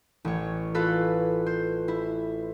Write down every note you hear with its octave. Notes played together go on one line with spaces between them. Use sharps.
A1 C#5
F4 A4 B4
C5
E4